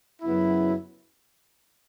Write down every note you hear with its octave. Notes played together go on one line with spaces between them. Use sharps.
F#2 C#3 F#3 B3 E4